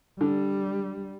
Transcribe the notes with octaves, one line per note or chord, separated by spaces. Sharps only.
D3 G3